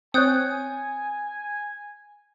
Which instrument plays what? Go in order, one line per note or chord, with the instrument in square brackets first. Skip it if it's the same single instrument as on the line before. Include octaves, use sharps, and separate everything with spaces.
[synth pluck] C4 C#5 [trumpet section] G#5 [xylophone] D#6 G6 [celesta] F#6 A6 C#7